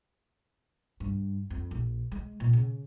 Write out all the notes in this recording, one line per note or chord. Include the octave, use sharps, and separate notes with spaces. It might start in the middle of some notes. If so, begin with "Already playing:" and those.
G2
F2
A#1
G#3
A#2
C#3